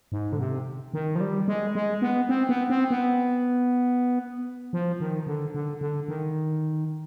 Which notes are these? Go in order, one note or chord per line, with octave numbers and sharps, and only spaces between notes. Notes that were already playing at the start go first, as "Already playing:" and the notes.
G#2
D3
C3
D#3
F3
G3
G#3
G#3
B3
C4
B3
C4
B3
F3
D#3
D3
D3
D3
D#3